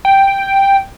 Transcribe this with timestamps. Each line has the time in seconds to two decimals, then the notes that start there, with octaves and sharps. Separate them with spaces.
0.05 G5